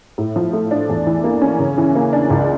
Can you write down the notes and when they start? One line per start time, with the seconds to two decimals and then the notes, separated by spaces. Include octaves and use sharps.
0.18 A2
0.36 F3
0.53 A3
0.71 D4
0.89 E2
1.06 E3
1.24 A#3
1.42 C#4
1.59 C#3
1.78 E3
1.95 A#3
2.13 D4
2.30 C#2